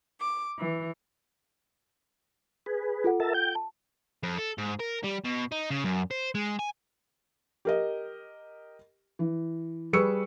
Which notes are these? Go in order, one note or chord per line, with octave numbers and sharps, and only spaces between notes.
D6
E3
G#4 B4
F4 A4 F#5
A#4 E5 A5
G5 G6
A5
F2
A4
G#2
A#4
G3
B2
D#4
C#3
F#2
C5
G#3
G#5
G4 A#4 D#5
E3
G3 G#4 B4 C#6 E6 C#7